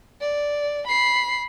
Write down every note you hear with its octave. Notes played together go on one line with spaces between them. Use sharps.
D5
B5 C7